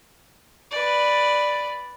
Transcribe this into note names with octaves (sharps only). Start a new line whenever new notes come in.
B4 D5